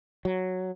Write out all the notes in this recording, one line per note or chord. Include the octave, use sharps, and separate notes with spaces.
F#3